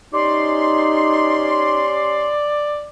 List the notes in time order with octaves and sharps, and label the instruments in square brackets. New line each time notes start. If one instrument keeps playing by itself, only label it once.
[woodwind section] C#4 G4 C6 [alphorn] D#4 [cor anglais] D5